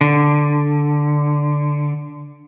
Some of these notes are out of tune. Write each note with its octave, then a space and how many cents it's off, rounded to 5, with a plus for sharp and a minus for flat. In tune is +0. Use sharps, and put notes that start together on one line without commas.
D3 +0